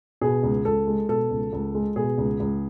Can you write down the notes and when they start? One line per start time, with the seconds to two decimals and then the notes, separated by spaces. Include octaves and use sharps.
0.21 B2 G#4
0.43 C#2
0.65 C#2 A4
0.87 G#3
1.09 B2 A4
1.31 C#2
1.53 C#2
1.75 G#3
1.96 B2 G#4
2.18 C#2
2.40 C#2